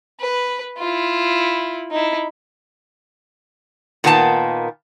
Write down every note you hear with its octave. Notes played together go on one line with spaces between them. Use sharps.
B4
E4 F4
D#4 E4
A#2 D#3 A#3 B3 G#5 A5